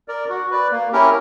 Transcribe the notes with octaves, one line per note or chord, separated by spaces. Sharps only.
A#4 D5
F#4
B4 D5
A#3
C#4 E4 G4 A#4